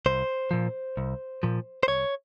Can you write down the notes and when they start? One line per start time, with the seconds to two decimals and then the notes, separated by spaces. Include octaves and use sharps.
0.06 C2 C5
0.51 A#2 F3
0.97 C2
1.43 A#2 F3
1.83 C5
1.88 C2 C#5